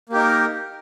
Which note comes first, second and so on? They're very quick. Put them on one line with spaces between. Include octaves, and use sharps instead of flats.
A#3 G4 D#4 A#4